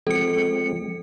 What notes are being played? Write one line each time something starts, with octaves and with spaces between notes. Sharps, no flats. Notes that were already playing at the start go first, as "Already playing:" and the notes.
F3 G#3 C4 A4 C#7